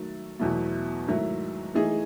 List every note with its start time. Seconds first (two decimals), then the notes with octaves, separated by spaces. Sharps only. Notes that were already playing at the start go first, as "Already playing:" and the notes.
Already playing: D#3 F#3 A3
0.39 E2 B2 F#3 A3 E4
1.07 G#2 D#3 F#3 A3 E4
1.74 E3 A3 D#4 G#4